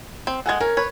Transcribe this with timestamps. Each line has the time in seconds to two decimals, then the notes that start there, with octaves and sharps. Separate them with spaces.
0.27 C4
0.46 G#3 A4 F#5 G#5 G#6
0.60 C#4 A#4
0.77 B4 C#5